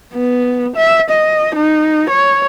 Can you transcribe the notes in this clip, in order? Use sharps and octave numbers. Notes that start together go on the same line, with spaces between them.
B3
E5
D#5
D#4
C#5